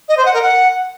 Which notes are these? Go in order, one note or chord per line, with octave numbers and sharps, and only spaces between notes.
D#5
C5
F#5
A#4
F#5